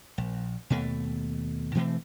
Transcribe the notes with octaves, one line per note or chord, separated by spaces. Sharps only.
A#1
D#2 B2 A3
B2 E3 A3 C4